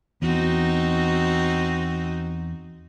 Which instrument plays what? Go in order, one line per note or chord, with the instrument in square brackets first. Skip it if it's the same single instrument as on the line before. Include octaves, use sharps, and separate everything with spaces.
[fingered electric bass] E2 [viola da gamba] C4 D#4 F#4